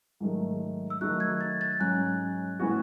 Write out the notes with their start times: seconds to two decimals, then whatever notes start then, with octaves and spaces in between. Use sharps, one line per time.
0.20 G#2 D#3 F#3 A3
0.90 E6
1.01 D#3 F#3 A3 D#4 F#4 F#6
1.20 G#6
1.41 A6
1.61 A6
1.80 G#2 F#3 C#4 F#6
2.59 A2 E3 B3 F#4